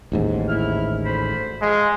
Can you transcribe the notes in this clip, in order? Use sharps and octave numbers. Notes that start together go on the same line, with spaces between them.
A1 D#2 G#2
E4 F6
D2 C5 B5
F3 G#3 F5